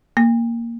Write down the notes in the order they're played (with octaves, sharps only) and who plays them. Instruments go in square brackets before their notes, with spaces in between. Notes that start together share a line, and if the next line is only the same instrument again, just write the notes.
[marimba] A#3